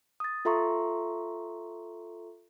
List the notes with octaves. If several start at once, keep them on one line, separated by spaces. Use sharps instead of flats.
D#6 A6
F4 A4 E5 A#5 C6 C#6